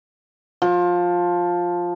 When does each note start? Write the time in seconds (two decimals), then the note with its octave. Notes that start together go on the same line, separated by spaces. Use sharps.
0.62 F3